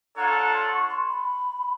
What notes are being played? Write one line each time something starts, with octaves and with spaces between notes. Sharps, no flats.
D4 F4 A4 C#5 F#5 A#5
C6
C#6
C6
B5